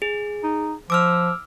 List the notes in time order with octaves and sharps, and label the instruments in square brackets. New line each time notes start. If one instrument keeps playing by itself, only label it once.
[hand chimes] G#4
[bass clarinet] D#4
[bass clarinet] F3 [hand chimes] D6 E6 F6